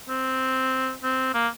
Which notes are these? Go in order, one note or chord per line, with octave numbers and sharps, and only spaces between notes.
C4
C4
A#3